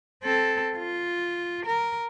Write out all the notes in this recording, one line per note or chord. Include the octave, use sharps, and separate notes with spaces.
C4 A4
F4
A#4